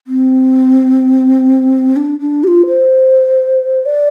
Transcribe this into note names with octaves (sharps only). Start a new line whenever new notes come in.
C4
D4
D4
G4
F4
C5
D5